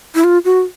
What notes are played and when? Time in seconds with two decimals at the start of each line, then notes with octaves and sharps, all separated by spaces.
0.15 E4
0.24 F4
0.45 F#4